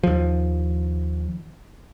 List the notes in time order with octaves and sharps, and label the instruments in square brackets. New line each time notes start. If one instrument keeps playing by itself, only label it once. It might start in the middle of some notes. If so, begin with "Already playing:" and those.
[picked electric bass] D#2 F3